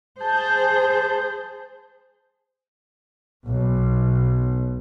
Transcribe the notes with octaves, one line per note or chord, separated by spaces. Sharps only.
G#4 C5 A5 G6
B1